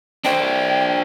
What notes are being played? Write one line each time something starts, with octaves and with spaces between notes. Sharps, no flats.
D4 C5 D5 G5